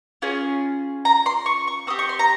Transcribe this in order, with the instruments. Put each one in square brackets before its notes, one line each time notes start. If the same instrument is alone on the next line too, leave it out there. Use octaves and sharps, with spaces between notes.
[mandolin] C#4 F4 G#4
A#5
C6
C#6
C#6
C4 G4 D#6
C#6
C6
A#5